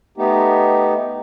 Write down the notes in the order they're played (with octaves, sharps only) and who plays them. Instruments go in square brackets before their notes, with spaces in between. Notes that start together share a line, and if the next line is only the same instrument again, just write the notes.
[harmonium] A3 B3 D#4 G4